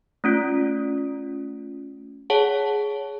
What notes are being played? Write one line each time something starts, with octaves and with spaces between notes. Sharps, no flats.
A3 C#4 F4
G#4 C#5 F#5 A5